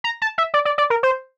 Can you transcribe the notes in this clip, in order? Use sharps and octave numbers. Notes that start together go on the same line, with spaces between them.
A#5
A5
E5
D5
D5
D5
A#4
C5